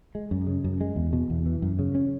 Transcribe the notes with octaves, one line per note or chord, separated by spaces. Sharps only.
G#3
F#2
C#3
F#2
G#3
E2
B2
E2
E3
F#2
C#3
C#4